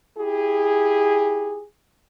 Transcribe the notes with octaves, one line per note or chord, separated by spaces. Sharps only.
E4 G4 G#4